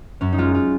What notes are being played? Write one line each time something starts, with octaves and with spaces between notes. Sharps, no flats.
F#2 C#4
D#4
G#3 F4
F4